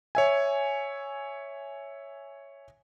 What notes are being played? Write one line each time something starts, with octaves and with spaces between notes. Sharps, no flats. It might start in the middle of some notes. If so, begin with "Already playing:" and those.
C#5 E5 G#5